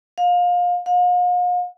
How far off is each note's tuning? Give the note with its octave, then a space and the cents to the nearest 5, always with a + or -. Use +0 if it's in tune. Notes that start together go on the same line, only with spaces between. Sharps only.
F5 +25
F5 +45